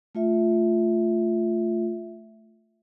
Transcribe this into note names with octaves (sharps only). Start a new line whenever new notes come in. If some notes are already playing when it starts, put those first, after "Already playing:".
A3 F4 E5